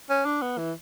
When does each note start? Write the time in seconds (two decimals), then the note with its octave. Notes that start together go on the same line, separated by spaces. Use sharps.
0.10 C#4
0.25 D4
0.42 B3
0.58 E3